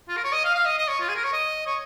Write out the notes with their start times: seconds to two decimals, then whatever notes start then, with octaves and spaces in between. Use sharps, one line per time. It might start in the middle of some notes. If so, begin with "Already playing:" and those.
0.08 F4
0.17 A#4
0.24 C#5
0.32 D#5
0.44 F5
0.55 F5
0.66 D#5
0.78 D#5
0.88 C#5
1.00 F4
1.08 G#4
1.16 A#4
1.24 C#5
1.33 D#5
1.67 C#5